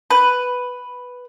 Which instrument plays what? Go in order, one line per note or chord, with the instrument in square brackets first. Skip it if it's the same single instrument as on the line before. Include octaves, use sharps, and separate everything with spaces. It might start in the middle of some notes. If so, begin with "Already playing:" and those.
[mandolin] B4